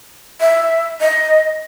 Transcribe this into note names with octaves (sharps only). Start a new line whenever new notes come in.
E5
D#5